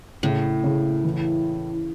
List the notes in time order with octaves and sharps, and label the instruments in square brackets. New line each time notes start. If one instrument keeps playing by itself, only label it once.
[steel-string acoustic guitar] A2 [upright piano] C#3
[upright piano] C#3
E3